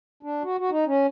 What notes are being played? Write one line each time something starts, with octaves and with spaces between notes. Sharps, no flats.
D4
F#4
F#4
D#4
C#4